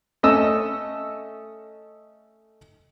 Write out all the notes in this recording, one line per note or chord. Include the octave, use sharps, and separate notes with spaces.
A3 C#4 D#5 E6